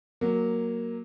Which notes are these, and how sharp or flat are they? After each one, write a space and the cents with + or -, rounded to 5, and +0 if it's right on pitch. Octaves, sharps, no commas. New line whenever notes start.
F#3 +0 A#3 +0